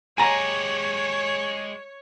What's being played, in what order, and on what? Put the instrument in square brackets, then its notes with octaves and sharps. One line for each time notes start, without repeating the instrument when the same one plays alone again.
[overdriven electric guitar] G#3 G4 [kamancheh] C#5 [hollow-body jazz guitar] G#5 A#5